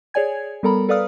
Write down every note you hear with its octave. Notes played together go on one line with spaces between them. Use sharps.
G#4 C#5 D5 G#5 G#6
G3 B3 A4 A#4 A#5 B5
A4 B4 D5 F5 D#6 F6